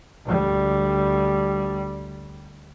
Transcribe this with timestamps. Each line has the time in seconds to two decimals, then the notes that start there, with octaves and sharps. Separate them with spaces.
0.25 D2 G3